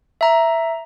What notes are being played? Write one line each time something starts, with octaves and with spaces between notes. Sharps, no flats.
E5 A#5